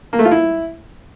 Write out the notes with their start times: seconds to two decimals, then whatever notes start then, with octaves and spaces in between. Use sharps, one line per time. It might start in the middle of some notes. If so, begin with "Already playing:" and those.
0.13 A#3
0.19 A3
0.25 F4
0.31 E4